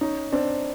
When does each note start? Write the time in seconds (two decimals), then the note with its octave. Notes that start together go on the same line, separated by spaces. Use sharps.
0.01 C#4 D#4
0.32 C4 D4